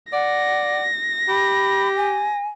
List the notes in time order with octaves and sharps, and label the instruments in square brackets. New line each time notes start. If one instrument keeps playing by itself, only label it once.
[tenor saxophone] D5 [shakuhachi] F#5 [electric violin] A#6
[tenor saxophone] G4 [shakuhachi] B5
[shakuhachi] G#5